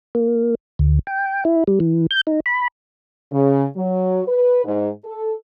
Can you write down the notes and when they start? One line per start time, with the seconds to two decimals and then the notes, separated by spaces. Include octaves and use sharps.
0.15 A#3
0.79 D2
1.07 G5
1.45 E4
1.67 G3
1.80 E3
2.11 G6
2.27 D#4
2.46 B5
3.33 C#3
3.76 F#3
4.28 B4
4.64 G#2
5.05 A4